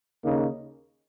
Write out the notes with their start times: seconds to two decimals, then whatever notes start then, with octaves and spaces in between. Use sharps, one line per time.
0.23 D#2 C#3 A#3 D#4